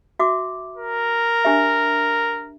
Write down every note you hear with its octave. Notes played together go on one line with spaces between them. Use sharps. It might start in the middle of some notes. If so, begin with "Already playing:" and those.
F#4 E5 D6
A#4
D4 G4 E5